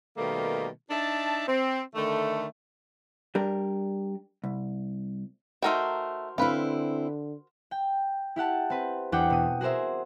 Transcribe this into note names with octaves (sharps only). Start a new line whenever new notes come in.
B2 D#3 G3 A3 A#3
D4 D#4 E5 A5
C4
D3 D#3 A3
G3 D4 A#4
C2
A3 D#4 F#4 A#4 C5 G5
D3 C4 E4 B4 F5
G5
E4 G4 F#5 A5
C4 B4
E2 D4 F#5 G5 D6
B2 D#6
F#4 G#4 A#4 C5 E5